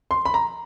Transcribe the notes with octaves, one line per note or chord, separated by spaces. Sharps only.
C6
B5
A#5